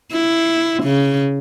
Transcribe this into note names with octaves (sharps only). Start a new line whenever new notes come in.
E4
C#3